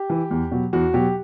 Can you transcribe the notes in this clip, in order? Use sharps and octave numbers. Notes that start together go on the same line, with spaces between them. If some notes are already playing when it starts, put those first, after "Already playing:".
Already playing: G4
E3
E2
B2 F#3
E2 F#4
B2 F#3 G4